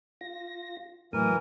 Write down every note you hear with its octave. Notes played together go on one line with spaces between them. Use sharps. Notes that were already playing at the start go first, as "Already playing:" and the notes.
F4 A#6
A2 E3 F#3 A#4 D#6